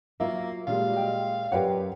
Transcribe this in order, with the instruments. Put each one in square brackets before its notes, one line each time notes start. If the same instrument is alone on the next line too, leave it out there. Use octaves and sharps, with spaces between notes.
[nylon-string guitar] F#3 F4 [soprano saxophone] A#3 [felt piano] E5
[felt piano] A#2 G3 G#3 [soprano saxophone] F5
[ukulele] D#5 G5
[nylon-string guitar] F#2 A#4 D5 [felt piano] G4 B4 C#5 [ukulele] F#5 G5